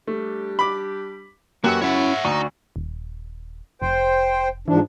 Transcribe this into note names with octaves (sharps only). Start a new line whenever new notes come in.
G3 A3 D4 G4
B5 D6
F#2 E3 A#3 F#4 G4 E6
C#4 E4 C#5 E5 F#5
D2 D#4 F#4 D5 C#6
D#1
F1 C5 G5
G#2 E3 F3 D4